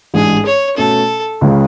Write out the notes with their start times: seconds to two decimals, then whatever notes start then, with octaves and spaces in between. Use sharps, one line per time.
0.14 A1 G#2 G#3 D4 G#4
0.46 C#5
0.77 B2 A3 C#4 A4
1.41 C#2 C#3 G#3 C#4